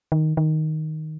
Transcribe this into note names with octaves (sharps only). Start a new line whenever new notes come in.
D#3
D#3